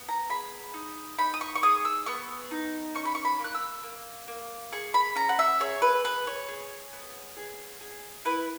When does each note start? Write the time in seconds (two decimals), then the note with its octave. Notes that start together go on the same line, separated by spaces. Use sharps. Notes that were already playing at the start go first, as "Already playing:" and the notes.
Already playing: B3
0.09 A#5
0.30 G#4 B5
0.74 D#4
1.18 D#4 B5
1.34 D#6
1.41 C#6
1.55 C#6
1.63 G#4 D#6
1.85 E6
2.06 B3 C#6
2.51 D#4
2.95 C#4 C#6
3.05 B5
3.15 C#6
3.25 B5
3.39 A#3
3.44 F#6
3.54 E6
3.83 A#3
4.28 A#3
4.72 G#4 C#6
4.94 B5
5.16 C#4 A#5
5.29 F#5
5.39 E5
5.60 G#4 C#5
5.82 B4
6.04 G#4 B4
6.27 C#5
6.48 G#4
6.93 B3
7.37 G#4
7.81 G#4
8.25 E4 B4